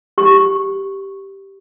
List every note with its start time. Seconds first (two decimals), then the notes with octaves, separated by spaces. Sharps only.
0.18 G4 C#6